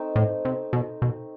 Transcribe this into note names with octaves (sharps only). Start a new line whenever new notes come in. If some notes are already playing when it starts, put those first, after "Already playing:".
Already playing: A3 C4 D#4
A2
C3
B2
B2